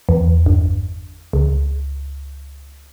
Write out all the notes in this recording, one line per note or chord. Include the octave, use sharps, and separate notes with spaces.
E2
G1
C#2